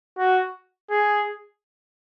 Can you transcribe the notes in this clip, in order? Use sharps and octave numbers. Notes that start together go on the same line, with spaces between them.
F#4
G#4